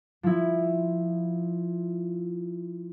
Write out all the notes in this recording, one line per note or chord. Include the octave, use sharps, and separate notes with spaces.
F3 E4